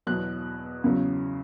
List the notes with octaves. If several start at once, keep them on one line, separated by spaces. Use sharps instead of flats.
E2 B2 F#3 F#6
E2 C#3 F#3